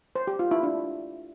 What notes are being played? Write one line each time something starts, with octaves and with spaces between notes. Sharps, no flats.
C5
G4
F4
E4
D4